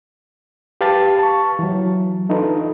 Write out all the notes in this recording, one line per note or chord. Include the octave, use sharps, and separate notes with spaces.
G4 B4 F5 A5 A6
A5 C#6
E3 F#3
D4 D#4 F4 A4 B4